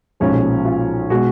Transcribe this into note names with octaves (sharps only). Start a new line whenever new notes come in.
B1 A#2 F3 G#3 C#4
F4
B2 G#3 F#4